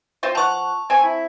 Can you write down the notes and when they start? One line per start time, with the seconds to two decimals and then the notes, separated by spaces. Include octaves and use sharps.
0.23 C4 F4 C5
0.35 F3 F#5 A5 C#6
0.90 C4 G#5
1.03 E4